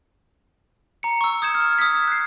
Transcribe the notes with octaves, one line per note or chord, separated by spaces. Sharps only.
A#5 C#7
C#6 E6
D#6 G6 G#6 C#7 E7
F6
D#6 E6 G#6 B6
F#6 C7